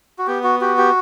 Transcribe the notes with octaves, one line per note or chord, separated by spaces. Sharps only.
F#4
B3 G4
F#4
F#4 G4
G4